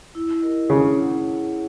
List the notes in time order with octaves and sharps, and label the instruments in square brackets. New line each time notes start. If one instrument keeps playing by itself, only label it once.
[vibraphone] E4
G4 A#4 D#5
[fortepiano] C#3 [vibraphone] E4
[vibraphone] G#4 C#5 F#5